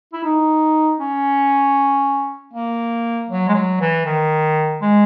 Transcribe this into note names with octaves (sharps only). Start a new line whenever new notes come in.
E4
D#4
C#4
A#3
F#3
G#3
F#3
E3
D#3
G#3